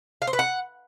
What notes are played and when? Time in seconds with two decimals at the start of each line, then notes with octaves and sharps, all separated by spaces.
0.22 F5
0.27 C5
0.33 B4
0.39 F#5